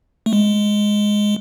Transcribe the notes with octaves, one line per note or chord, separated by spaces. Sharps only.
A3
G#3